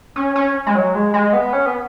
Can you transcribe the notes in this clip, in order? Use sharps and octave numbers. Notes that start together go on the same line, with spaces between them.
C#4
C#4
G#3
F#3
G#3
G#3
B3
C#4
B3